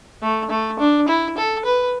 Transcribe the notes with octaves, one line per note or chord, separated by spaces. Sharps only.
A3
A3
D4
E4
A4
B4